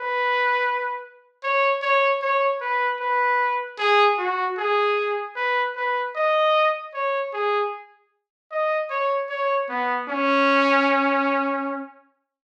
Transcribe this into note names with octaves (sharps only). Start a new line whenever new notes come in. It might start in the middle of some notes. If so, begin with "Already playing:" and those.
Already playing: B4
C#5
C#5
C#5
B4
B4
G#4
F#4
G#4
B4
B4
D#5
C#5
G#4
D#5
C#5
C#5
B3
C#4